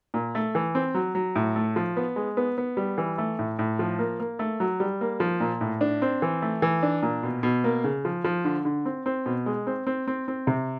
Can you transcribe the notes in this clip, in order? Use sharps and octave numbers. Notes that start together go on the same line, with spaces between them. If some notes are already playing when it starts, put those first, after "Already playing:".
A#2
A3
E3
C4
F#3
F#3
A2
A3
F3
B3
G#3
B3
B3
G3
E3
A3
A2
A2
F3
A#3
A#3
A3
F#3
G3
A#3
F3
A#2
A2
D4
C4
E3
A3
E3
D4
A#2
B2
B2
A#3
C#3
F3
F3
D3
D3
C4
C4
B2
G#3
C4
C4
C4
C4
C3